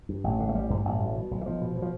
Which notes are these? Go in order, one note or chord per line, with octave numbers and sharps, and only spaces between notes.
G2
A1
D3
A3
A1 G3
G2
A1
B2
B2
B1
E3
B1 F3
B2
B2
F3